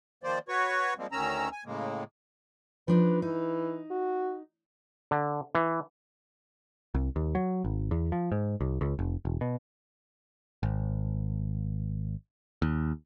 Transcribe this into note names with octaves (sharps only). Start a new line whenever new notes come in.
D#3 F3 A#3 C5 D5
F#4 B4 C#5 C#6
F3 G3 G#3 A#3 C4
D2 D#3 C#4 A#5 E6
G#5
A2 C#3 G#3 A#3
F3 D4 D#4 B4
E3 D#4
F#4
D3
E3
C2
D#2
F#3
G#1
E2
F3
G#2
C2
C#2
F1
E1
B2
G#1
D#2